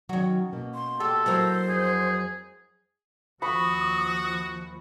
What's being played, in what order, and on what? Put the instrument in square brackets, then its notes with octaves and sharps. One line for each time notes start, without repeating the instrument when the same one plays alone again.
[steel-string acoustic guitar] D#3 F#3 [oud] C#4 F#4
[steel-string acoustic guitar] B2 A#3
[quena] C6
[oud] G4 [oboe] A4
[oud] F#3 E4 A#4 [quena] C5
[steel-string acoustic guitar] F2 [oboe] G#4
[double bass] D#2 F3 [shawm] F#4 [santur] B5 C#6 [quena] D#6